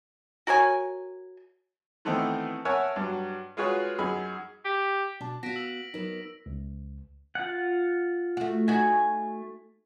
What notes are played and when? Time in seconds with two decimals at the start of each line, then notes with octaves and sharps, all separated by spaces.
0.47 F#4 A#4 C#5 G#5
2.05 D#3 E3 A3 B3 C4 D#4
2.65 A#4 C#5 E5 F#5 G#5 A5
2.96 G2 F#3
3.57 G#3 F4 F#4 G#4 B4 C#5
3.99 F#2 D#4 G#4 B5
4.65 G4
5.21 B2 D4 A5
5.43 B3 F#4 F5 A#6 B6 D7
5.56 E6 F#7
5.94 F#3 B3 D#4 A#4
6.46 C#2
7.35 F4 F#5
8.37 A3 F#4
8.68 A3 D#4 F#4 G#5